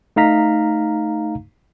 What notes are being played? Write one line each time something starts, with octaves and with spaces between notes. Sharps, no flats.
A3 D#4 F5 A#5 B6